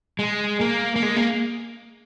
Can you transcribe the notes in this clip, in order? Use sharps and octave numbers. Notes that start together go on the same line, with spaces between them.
G#3
A#3
A#3
G#3
A#3